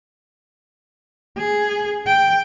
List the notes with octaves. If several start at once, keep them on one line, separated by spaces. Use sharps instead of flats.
G#4
G5